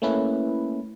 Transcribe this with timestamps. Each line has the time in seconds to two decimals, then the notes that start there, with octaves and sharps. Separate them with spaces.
0.02 A3 A#3 C#4 E4 B4